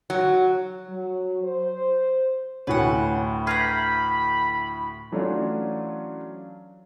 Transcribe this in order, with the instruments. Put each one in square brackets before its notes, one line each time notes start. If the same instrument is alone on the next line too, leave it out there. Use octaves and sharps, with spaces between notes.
[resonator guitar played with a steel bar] F#3
[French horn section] F#3
C5
[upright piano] D2 A2 [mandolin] B4 F#5 [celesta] C#5 G#5
[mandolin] B4 A#5 G6 [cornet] B5 [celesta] F6 G#6 C7
[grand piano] E3 F#3 A3 C#4 D4 F4